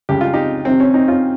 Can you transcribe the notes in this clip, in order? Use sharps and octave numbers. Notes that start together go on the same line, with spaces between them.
C#2 C#3 G3 G4
F4
D#4 G4
F2 C3 D#3 C4
C#4
C4 D#4
C#4 F4